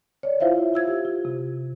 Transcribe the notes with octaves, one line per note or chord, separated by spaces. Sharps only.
C#5 D5
E4 F4 C5 E5 F5
F4 E6 G#6
G4
F4
C3